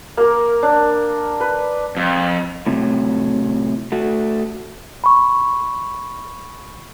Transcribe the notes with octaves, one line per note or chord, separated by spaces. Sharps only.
A#3 A#4
D4
B4
F2
A2 C3 F#3
A3 F#4
B5 C#6